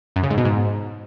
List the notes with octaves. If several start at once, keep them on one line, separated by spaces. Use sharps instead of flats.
F#2
C#3
G#2
B2
G#2